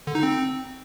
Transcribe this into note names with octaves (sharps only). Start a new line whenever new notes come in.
D3
D#4
C4